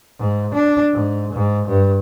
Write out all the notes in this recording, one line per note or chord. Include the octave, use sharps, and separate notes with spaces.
G#2
D4
G#2
G#2
G2